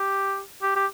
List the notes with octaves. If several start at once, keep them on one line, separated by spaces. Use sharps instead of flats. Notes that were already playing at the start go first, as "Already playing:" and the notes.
Already playing: G4
G4
G4